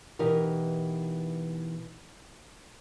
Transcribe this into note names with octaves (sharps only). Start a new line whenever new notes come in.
B2 E3 D#4 G4 A#4